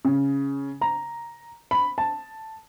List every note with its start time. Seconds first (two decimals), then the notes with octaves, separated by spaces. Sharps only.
0.05 C#3
0.81 A#5
1.71 B5
1.98 A5